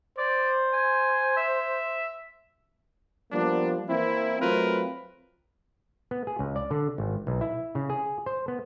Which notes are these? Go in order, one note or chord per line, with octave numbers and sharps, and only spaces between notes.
C5 D5
G#5
E5
F3 G3 A#3 B3 D4
E3 A#3 C4 E4
F#3 A3 C4 F4 A#4 B4
B3
G#4
C#2
D5
D3
G#1
B1
E4
C#3
G#4
C5
B3